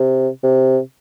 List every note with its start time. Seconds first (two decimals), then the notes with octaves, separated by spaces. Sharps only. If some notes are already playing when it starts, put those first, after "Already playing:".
Already playing: C3
0.43 C3